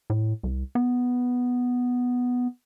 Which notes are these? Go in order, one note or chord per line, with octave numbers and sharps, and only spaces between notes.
A2
C2
B3